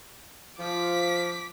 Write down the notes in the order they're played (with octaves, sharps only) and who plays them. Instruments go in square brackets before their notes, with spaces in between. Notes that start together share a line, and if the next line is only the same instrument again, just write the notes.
[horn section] F3 [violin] D6 B6